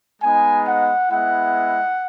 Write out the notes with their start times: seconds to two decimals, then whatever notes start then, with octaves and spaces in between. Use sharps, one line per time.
0.22 G#3 B3 D#4 G#5
0.66 F#5
1.11 G#3 B3 E4 F#5